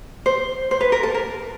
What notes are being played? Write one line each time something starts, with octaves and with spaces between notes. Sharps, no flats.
C5
C5
B4
A#4
A4
A#4